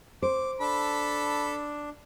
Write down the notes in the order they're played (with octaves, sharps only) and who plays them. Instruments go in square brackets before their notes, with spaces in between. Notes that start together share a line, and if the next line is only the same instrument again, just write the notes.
[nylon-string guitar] C5 [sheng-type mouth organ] D6
[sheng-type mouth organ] D4 [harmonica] A4 B5